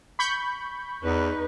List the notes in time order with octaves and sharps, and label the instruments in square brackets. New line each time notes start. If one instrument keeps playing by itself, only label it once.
[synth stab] B5 C#6 G6
[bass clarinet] E2 [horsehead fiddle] D#4 B4